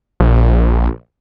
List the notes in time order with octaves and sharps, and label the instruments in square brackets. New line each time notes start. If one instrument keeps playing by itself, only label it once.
[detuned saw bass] A#1